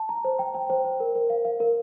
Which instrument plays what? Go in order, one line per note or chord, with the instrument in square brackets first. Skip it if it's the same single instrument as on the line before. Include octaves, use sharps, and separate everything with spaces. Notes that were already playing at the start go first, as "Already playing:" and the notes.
Already playing: [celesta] A5
A#5
C5
G5
G5
C5
C5
A#4
A#4
F5
F5
A#4